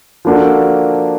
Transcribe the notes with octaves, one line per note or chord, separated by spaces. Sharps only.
F3 A#3 D4 F#4 A4